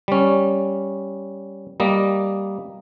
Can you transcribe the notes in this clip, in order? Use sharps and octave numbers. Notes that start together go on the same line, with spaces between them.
G3 C#4
G3 A#3 D#5